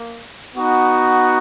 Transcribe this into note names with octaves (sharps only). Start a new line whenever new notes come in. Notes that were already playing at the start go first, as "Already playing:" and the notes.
Already playing: A#3
B3 D#4 F#4